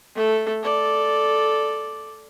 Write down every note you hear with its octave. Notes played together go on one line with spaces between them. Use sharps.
A3 A4
A4 D5